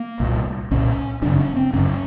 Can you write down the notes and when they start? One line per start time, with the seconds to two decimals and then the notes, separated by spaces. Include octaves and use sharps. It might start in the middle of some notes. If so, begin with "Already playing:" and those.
Already playing: A#3
0.20 C2 A#2
0.71 C2 A#2 C#4
1.22 G1 F#2 C#3 D4
1.39 C#4
1.56 C4
1.73 G1 F#2 C#3 C#4